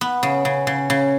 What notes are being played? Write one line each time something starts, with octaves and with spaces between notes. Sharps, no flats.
B3
C#3
C#3
C#3
C#3